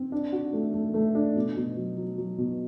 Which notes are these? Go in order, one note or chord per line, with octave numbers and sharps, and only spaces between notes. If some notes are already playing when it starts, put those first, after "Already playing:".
Already playing: C4
D4
F#4
A3
A3
A3
D4
B2
B2
F#3
F#3
F#3
B2